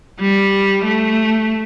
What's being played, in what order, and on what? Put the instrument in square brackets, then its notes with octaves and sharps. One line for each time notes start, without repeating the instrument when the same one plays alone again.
[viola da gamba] G3
A3